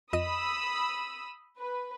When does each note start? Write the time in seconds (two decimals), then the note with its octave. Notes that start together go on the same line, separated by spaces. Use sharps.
0.13 F2 D#5 B5 D#6 E6 D#7
1.58 B4